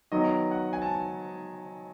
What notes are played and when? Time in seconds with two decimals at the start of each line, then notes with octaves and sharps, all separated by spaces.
0.12 D#3 F#3 B3 D#5
0.51 F#5
0.73 G#5
0.82 A5